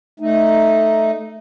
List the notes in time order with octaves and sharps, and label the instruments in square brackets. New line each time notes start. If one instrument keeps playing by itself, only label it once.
[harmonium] A3 D#4